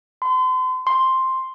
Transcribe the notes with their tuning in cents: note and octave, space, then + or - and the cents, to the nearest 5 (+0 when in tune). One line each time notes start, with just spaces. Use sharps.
C6 -40
C6 +5